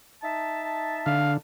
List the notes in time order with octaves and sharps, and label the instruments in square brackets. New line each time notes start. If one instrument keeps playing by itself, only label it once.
[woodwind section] D#4 E5 A5
[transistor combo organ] D3 [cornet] F5